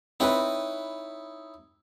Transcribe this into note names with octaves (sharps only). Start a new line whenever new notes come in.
C4 D#4 E4 B4 C#5